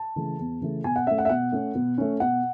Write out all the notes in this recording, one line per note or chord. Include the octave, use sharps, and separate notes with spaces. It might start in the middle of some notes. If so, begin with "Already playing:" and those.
Already playing: A5
C#3 E3 A3
E2
C#3 E3 A3
B2 G#5
F#5
A3 C#4 E5
F#5
E5
B2 F#5
A3 C#4
B2
A3 C#4
B2 F#5